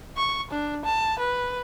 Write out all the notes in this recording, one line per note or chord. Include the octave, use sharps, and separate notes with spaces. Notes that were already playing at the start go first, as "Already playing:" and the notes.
C#6
D4
A5
B4